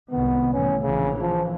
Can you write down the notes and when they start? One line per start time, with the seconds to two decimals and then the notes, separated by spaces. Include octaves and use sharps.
0.11 C2 G#2 D#3 B3
0.53 A2 C3 E3 C#4
0.82 A#1 C#3 E3
1.21 F3